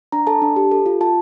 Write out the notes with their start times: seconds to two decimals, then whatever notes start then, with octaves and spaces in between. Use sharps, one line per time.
0.12 D4 A#5
0.27 A4 A5
0.42 D4
0.56 G4
0.71 A4
0.86 F4
1.01 F4 A5